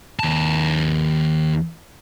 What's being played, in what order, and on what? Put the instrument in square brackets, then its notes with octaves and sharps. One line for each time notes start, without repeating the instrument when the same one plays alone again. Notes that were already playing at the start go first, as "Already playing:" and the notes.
[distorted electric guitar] D#2 A5